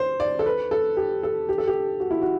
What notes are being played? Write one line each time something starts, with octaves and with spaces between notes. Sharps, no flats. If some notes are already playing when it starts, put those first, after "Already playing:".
Already playing: C5
D5
A4
B4
A4
G4
A4
G4
A4
G4
F#4
E4
F#4